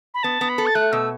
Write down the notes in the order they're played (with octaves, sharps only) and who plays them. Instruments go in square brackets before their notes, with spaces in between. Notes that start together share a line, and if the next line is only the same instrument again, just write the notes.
[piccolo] B5
[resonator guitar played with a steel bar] B3 [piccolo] A5
[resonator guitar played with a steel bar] B3
[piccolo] B5
[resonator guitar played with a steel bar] A4
[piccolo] A6
[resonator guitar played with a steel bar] A3 [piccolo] F#6
[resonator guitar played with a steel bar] B2 [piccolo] E6